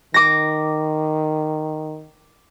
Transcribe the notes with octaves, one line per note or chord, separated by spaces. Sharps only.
D#3 D6 A#6